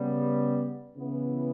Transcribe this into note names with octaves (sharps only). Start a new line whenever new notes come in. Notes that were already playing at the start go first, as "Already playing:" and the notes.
Already playing: C#3 G3 B3
C#3 E3 B3